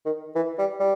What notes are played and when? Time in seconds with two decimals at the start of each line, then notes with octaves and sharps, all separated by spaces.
0.06 D#3
0.35 E3
0.59 G3
0.80 G3